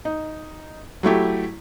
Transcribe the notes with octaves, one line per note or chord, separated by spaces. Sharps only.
D#4
F#3 A3 E4 G4